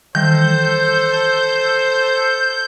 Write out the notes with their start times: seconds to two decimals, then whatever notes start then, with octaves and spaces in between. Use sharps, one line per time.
0.15 D#3 E3 G3 A4 C5 G6